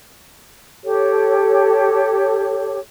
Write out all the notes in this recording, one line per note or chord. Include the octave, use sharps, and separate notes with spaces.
G4 A4 C#5